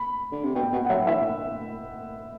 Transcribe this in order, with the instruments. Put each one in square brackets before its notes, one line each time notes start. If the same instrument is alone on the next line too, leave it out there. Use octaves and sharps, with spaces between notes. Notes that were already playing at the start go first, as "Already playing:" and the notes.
Already playing: [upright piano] B5
[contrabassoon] D3
C3
[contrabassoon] B2 [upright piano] G5
[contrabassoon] B2 [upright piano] F#5
[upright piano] F#5
[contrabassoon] F#3 [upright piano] E5
[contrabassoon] E3 [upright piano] E5